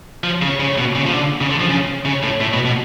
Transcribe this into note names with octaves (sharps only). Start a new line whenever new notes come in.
F3
C#3
C#3
B2
C#3
F3
D3
C#3
D3
F3
C#3
C#3
A2
A2
B2
B2